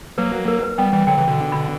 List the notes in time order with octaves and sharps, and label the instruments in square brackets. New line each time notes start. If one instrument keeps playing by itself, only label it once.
[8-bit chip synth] F#3 A#3 [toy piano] B4
[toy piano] A#4
B4
[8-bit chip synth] G3 B3 [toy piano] G5
[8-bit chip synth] E3 G3
[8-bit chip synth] D3 F#3 [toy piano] G5
[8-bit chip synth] C#3 E3
B2 D3
[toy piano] B5